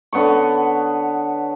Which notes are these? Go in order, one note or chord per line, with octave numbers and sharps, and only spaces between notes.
D3 B3 C#5 C#6